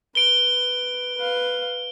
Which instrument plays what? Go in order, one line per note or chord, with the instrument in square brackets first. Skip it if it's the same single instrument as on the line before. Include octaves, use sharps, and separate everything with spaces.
[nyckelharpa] B4 [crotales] D7 G7
[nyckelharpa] B4 F5